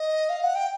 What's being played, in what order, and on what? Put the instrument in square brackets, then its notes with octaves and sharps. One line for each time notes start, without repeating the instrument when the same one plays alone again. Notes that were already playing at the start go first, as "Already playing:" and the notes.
Already playing: [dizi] D#5
F5
F#5
G5